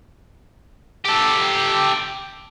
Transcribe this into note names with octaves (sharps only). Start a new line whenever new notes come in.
G4 A4